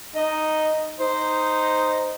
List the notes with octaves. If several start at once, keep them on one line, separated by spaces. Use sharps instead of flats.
D#4 D#5
D#4 C5